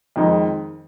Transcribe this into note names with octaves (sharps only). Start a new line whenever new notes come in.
F2 D#3 G#3 D#4